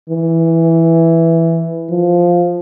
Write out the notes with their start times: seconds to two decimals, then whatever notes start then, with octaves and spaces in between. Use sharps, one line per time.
0.10 E3
1.91 F3